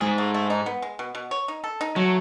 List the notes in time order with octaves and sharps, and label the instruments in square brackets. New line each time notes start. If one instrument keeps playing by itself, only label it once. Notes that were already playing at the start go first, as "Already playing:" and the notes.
[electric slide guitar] G#2 G#3 [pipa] G#4
[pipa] A3
A3
D#4
B3
G#3
B2
B2
C#5
D#4
A4
D#4
[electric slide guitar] F#3 [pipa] A3